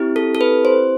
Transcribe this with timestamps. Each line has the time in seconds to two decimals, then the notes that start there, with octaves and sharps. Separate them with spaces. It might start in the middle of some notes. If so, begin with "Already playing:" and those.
Already playing: C4 E4 G4
0.16 A4
0.35 A4
0.41 B4
0.65 C5